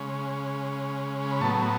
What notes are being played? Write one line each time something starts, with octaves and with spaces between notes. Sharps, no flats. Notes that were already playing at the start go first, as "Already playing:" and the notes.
Already playing: C#3 G#3 C#4
B5
A2 F#3 B3 A5 C#6